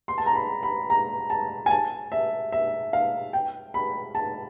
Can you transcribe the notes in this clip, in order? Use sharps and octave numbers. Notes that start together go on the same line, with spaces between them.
C6
A5
A#5
B5
B5
A#5
A5
G#5
A5
E5
E5
F5
G5
B5
A5